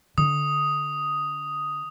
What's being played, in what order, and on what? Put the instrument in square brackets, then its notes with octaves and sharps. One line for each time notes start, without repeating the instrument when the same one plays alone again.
[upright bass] D3 [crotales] D#6